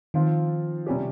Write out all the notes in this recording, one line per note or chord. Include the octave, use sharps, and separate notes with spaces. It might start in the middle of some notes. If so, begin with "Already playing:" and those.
D#3 F3 C4 F4
C3 G3 C#4 G4